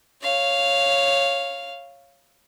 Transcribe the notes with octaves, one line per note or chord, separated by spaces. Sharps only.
C#5 F5